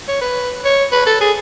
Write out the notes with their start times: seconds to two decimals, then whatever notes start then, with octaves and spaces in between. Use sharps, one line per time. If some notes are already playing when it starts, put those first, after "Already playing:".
0.08 C#5
0.21 B4
0.65 C#5
0.92 B4
1.06 A4
1.21 G#4